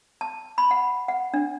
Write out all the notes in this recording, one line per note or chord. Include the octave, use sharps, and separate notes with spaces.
A5
B5
F#5
F#5
D4